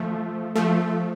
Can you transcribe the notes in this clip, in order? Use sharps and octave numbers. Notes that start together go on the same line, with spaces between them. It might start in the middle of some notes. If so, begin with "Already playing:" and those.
Already playing: F3 A3
F3 A3